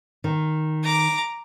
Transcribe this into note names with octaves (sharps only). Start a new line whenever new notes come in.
D#3
A#5 D6